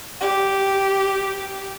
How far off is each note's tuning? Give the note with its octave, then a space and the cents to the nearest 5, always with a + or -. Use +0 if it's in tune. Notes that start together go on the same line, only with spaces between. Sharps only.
G4 -10